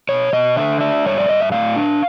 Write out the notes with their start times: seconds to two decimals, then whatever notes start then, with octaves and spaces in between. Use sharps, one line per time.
0.09 B2 C#5
0.33 B2 D#5
0.57 D3 E5
0.81 D4 E5
1.05 G2 C#5
1.18 D5
1.29 G2 D#5
1.41 E5
1.52 A2 F5
1.76 D4